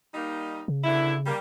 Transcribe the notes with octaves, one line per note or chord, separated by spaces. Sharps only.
G3 A#3 D#4
C#3
B2 D3 E4
G3 A#3